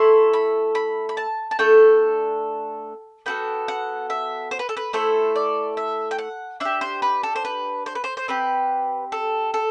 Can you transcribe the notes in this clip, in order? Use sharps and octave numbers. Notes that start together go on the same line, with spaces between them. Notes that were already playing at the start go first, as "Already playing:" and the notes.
Already playing: A3 E4 A4 C6
B5
B5
B5
A5
A5
A3 D4 A4 G5
B3 F#4 A4 G5
F#5
E5
C5
B4
A4
B4
A3 E4 A4 C5
D5
E5
G5
F#5
D4 G4 E5
C5
B4
A4
C5
B4
C5
B4
C5
C5
C4 G4 B4
A4
A4